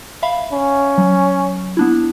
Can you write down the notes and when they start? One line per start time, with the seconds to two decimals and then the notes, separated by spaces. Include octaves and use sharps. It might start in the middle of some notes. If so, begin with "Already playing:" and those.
0.23 E5 F5 B5
0.52 C#4
0.98 F#3
1.77 B3 D4 E4